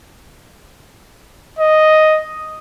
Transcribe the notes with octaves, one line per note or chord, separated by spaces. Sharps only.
D#5